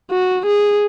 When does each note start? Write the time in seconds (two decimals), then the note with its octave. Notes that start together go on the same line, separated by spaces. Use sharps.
0.11 F#4
0.46 G#4